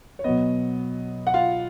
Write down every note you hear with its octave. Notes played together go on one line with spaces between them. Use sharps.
C#5
B2 F#3 B3 D#5
F#5
F4 F5